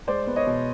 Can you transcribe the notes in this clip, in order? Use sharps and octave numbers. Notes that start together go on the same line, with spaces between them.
G#3 C5 D5
B3
C#5 D#5
B2